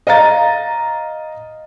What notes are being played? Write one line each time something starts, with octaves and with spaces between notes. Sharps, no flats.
D#5 F5 A#5 A6